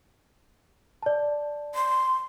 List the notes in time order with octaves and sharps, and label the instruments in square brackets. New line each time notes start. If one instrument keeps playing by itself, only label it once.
[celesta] D5 A5
[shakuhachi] C6